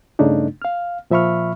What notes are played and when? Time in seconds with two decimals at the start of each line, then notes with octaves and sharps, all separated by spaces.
0.19 G2 C#3 A3 D4 D#4
0.62 F5 F6
1.10 A#2 F3 E5 B5 C#6 F6